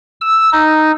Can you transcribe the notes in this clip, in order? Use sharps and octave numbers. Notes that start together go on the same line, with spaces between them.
E6
D#4